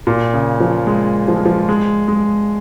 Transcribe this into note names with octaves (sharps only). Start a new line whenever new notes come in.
A#2
C#3
F3
G#3
F3
G#3
F3
G#3
G#3